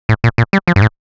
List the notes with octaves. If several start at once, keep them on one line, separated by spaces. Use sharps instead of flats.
A2
A#2
A#2
G3
F3
G2
A2